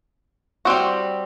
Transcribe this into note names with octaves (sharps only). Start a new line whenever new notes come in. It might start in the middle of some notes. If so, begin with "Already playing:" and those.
G3 C4 F#4